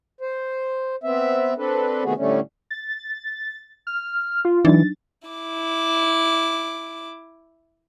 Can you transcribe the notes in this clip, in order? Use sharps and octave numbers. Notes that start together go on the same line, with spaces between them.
C5
B3 C4 E5
C4 D4 A4 B4
C3 D#3 A3 B3 F#4 G#4
A2 D3 G3 A3 C#4
A6
F6
F4
E3 F#3 D4 D#4 A6
E4 D6